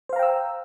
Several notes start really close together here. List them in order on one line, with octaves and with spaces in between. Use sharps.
C5 F5 A#5 G5 E6